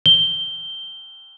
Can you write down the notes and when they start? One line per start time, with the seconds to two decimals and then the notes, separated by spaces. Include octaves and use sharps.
0.06 G7